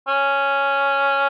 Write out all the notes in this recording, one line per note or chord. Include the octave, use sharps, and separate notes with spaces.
C#4